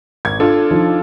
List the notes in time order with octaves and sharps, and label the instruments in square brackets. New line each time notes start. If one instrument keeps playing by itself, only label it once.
[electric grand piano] G#1 [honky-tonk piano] G#6
[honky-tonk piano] D4 F4 [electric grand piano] A4
[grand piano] F3 D#4